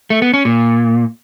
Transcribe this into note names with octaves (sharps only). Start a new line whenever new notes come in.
A3
B3
C#4
A#2